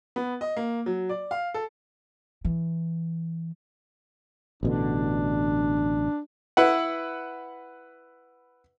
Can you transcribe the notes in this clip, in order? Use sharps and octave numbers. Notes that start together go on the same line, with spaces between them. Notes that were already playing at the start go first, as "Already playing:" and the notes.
B3
D#5
A#3
F#3
D5
F5
A4
E3
A1 B2 D3 D4
E4 B4 F#5